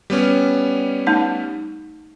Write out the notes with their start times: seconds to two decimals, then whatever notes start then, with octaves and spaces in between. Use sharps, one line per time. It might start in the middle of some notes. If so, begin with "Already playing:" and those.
0.10 G3 B3 C#4
1.07 A3 D#4 A5